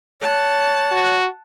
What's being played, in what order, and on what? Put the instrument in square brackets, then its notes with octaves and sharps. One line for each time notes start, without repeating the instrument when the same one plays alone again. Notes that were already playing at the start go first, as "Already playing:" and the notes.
[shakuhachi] C#5 [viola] F#5 A5
[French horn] F#4